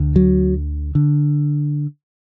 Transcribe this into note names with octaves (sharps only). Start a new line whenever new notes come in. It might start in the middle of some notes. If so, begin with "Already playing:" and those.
Already playing: D2 D3
F#3
D3